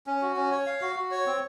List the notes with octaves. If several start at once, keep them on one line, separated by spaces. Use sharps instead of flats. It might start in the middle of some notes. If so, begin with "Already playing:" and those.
C#4
F#4
C#4
C#5
F5
F#4
F#4
C#5
C4